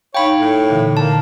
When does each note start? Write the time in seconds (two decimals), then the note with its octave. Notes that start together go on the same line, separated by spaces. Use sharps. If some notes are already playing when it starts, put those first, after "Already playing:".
0.15 D#4 C#5 F5 G5 B5
0.38 A2
0.70 A#2 D3 E3
0.97 A#3 A5